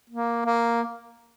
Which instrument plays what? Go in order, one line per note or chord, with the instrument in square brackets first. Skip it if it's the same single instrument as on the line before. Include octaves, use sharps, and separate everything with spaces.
[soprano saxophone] A#3
A#3